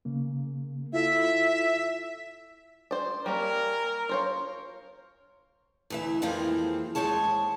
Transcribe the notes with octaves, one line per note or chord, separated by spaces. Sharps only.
C#3 A#3
E4 F4 A4 E5
C5 D5
G3 A#3 C#4 A#4
F4 C5 C#5
D2 E3 E5
F2 E3 F3 G#3 A#3 C4
D#2 G#3 C5 C#5 A5